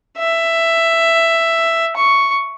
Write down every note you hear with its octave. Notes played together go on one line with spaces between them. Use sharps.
E5
C#6